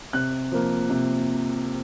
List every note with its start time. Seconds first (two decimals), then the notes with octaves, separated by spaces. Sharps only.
0.13 C3 F#6
0.52 F3 A#3
0.90 C3